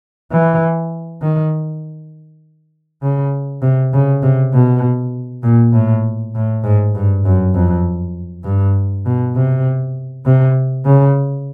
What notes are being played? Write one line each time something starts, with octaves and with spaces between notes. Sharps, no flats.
E3
D#3
C#3
C3
C#3
C3
B2
A#2
A2
A2
G#2
G2
F#2
F2
G2
B2
C3
C3
C#3